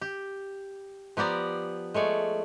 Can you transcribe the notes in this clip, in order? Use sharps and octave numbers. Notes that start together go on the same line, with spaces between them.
G4
F3 B3 G4 D5 A#5
G#3 A3 C#5 D5